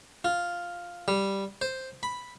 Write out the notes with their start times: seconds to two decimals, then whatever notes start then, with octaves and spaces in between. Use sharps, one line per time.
0.25 F4
1.08 G3
1.61 C5
2.03 B5